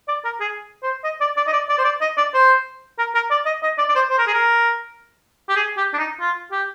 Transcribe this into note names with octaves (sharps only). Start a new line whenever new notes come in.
D5
A#4
G#4
C5
D#5
D5
D5
D#5
D5
D5
C5
D5
D#5
D5
C5
A#4
A#4
D5
D#5
D#5
D5
D5
C5
C5
A#4
G#4
A#4
G4
G#4
G4
D4
D#4
F4
G4